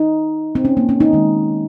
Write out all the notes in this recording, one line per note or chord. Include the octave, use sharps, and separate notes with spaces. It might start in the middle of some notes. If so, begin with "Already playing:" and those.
Already playing: D#4
C4
C#4
A#3
C#4
D#4
D#3 G#3